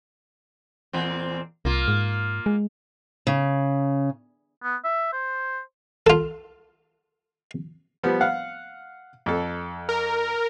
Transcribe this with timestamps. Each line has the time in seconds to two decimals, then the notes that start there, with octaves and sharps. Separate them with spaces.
0.93 E2 A#2 C4
1.65 C2 A#3 F4
1.88 G#2
2.46 G#3
3.27 C#3
4.63 B3
4.84 E5
5.13 C5
6.07 F4 A4
8.03 F3 G3 B3
8.21 F5 F#5
9.26 F2 A4
9.89 A#4